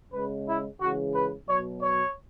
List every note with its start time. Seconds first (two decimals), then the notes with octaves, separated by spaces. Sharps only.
0.12 C#3 G#3 B4
0.46 E4
0.79 C#3 E3 G#3 F#4
1.14 B4
1.48 B2 F#3 C#5
1.80 C#5